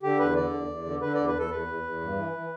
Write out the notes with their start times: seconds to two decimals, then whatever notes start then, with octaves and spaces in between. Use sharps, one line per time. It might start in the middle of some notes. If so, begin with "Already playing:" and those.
0.03 D3 G4
0.19 E2 B4
0.36 D3 D5
0.53 E2
0.68 E2
0.85 D3
1.02 D3 B4
1.14 E2 D5
1.27 B4
1.35 E2 A4
1.51 E2 B4
1.67 E2
1.83 E2
2.01 G2
2.16 E3
2.33 E3